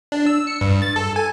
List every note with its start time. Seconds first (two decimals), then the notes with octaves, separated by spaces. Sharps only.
0.12 D4
0.26 E6
0.47 C#7
0.61 G2
0.82 A6
0.96 A4
1.16 G#5